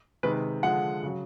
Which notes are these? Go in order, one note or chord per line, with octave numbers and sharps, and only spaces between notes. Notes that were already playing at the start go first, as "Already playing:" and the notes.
C3 D#3 G#3 B4
D3 F3 G#3 F#5
C#3 F#3